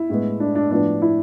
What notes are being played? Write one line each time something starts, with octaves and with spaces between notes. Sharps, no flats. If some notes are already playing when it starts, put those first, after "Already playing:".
Already playing: E4
A2 G#3 B3
D4
D4
A2 F3 B3 D4
E4